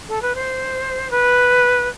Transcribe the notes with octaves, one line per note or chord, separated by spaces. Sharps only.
A4
B4
C5
B4